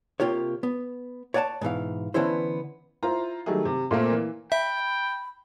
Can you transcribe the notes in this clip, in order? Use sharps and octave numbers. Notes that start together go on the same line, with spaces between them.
C3 A#3 F4 G4 C#5
B3
C#5 D5 F#5 G#5 A5
G#2 B2 E3 F5
D3 E3 B3 C#4 E4 C5
E4 F4 C5 A#5
D#3 F#3 G3 A3 G#4
C3
A#2 A3 A#3 C4
E3
E5 G5 B5